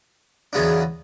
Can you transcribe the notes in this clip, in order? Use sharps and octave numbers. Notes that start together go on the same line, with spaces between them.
E2 C#3 F#3 B3 D4